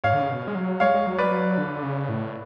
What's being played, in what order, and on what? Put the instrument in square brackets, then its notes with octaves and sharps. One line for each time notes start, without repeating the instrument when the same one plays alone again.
[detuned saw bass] G#2 [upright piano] C#5 F5
[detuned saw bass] D3
C#3
B2
G#3
F#3
[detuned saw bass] G#3 [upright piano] C#5 F5
[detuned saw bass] G#3
F#3
[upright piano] B4 D5
[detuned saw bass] F#3
D3
C#3
A2